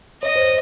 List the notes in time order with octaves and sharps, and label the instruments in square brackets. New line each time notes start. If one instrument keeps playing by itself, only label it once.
[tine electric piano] C#5 [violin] D#5
[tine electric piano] C5